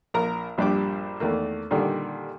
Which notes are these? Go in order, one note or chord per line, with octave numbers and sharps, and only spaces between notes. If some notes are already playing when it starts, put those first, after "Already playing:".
A#1 A#4 A#5
A#1 G2 D4 G4 D6
E2 D#3 A3 A#3
A#2 D3 D#3 G3